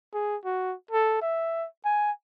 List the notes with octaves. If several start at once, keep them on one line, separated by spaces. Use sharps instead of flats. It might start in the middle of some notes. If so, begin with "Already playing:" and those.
G#4
F#4
A4
E5
G#5